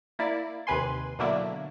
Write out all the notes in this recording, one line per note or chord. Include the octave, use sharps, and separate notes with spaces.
A#3 E4 D5
D#2 C3 B4 G#5 C6
B2 D3 F#3 A#3 D4 E4